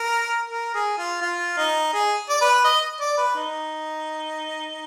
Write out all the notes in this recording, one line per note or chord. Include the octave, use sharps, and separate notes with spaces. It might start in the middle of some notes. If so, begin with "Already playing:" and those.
Already playing: A#4
A#4
G#4
F4
F4
D#4
G#4
D5
B4
D#5
D5
B4
D#4